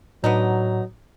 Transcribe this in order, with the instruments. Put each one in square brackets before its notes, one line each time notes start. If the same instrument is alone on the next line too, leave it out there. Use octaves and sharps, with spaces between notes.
[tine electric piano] A2 [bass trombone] F#3 [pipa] B3 D4 D#4